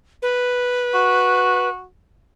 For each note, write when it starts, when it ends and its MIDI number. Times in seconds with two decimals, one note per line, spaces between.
0.22 1.69 71
0.95 1.86 66